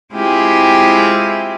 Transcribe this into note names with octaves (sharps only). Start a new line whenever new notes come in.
G#3 C4 E4 F4 G4 G#4